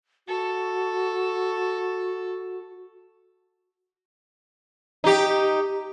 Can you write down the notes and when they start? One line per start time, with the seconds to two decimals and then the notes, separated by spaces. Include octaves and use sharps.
0.28 F#4 A4
5.04 D#4 G4